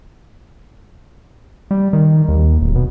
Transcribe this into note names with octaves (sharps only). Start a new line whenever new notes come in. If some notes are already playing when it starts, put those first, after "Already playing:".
G3
D#3
D#2
D1
B2